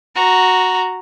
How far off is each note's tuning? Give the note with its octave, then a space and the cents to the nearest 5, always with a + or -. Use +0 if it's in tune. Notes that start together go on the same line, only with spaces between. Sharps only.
F#4 +0 A#5 +0